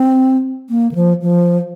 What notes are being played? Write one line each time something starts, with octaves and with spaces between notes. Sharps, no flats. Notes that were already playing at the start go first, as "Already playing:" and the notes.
Already playing: C4
A#3
D#3
F3
F3